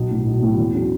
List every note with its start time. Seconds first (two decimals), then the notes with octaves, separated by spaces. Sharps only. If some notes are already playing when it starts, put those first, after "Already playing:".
Already playing: B1
0.11 A2 F#3
0.26 B1
0.42 A2 F#3
0.58 E2
0.74 C#3 F#3